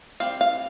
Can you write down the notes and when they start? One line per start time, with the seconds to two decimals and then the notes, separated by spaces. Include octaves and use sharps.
0.20 G3 C4 F5
0.41 F5